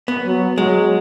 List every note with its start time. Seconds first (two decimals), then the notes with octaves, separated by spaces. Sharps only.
0.08 B3
0.25 F#3
0.58 F#3 G#3